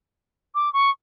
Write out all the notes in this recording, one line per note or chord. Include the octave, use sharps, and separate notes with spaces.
D6
C#6